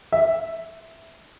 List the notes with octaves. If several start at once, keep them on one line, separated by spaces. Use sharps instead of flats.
E5